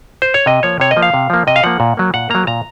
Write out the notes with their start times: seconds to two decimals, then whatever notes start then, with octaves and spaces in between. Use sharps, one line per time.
0.22 C5
0.34 C#5
0.46 C3 D#5
0.63 F3 A#3 C#5
0.80 C3 C#5
0.91 D#5
0.96 F3 A#3
1.02 F5
1.14 C3
1.30 F3 A#3
1.47 C3 D#5
1.56 F5
1.63 F3 A#3 F#5
1.80 A#2
1.97 F#3 A#3
2.14 A#2 F#5
2.30 F#3 A#3 A#5
2.47 A#2 A#5